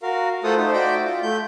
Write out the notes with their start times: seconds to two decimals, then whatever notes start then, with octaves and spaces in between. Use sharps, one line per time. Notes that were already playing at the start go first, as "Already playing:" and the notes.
0.03 F#4 A#4 F5
0.44 A3 F4 A4 C5 F#5 D#6
0.57 A3 D#4 C5
0.73 F#4 D5 E5 G5 D6
1.05 F4
1.22 A3 G6